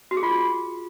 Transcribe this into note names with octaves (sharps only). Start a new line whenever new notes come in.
F#4
G#4
F4